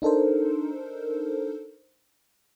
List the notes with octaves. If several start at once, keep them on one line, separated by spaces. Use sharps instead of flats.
D4 D#4 A4 A#4 C5